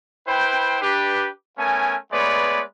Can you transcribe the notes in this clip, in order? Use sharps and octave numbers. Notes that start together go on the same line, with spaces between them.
E4 B4 C5 G5
D4 G4 B4
A3 B3 C#4 A#4 G#5
G#3 A3 B3 B4 C#5 D5